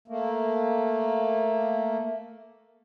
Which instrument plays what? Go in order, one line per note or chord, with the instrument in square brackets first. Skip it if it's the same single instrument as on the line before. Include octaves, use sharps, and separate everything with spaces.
[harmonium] A3 A#3